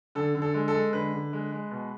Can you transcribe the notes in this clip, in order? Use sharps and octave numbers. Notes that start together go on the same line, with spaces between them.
D3 A4
D3
A4
G#3
A4
G#3
D3 B4
D3
G#3
G#3
B2